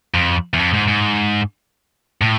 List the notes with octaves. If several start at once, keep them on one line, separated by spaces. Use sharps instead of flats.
F2
E2
F2
G#2
G#2
A2